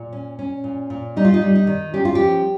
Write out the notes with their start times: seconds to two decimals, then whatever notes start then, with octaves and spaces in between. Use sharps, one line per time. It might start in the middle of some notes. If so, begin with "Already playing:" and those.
Already playing: A#2
0.13 C#4
0.39 C#4
0.64 A#2
0.90 A#2
1.16 G3 D#4
1.25 F4
1.34 D#4
1.41 G3
1.55 D#4
1.67 D#3
1.94 C#4 G4
2.05 F4
2.15 F3 G4